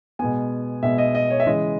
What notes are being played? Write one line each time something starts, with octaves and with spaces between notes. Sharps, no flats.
B2 G#3 B3 G#5
B2 G#3 B3 E5
D#5
D#5
C#5
E5
C#3 E3 G#3 D#5